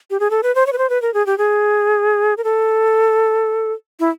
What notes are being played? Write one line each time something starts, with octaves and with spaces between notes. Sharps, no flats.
G4
G#4
A4
B4
C5
C#5
B4
C5
B4
A#4
G#4
G4
G#4
A#4
A4
E4